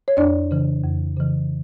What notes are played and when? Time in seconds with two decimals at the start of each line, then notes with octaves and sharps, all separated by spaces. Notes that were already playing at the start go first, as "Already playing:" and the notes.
0.08 C#5
0.17 F2 D4 D5
0.51 C#3 E3
0.84 F2
1.17 C#3 E3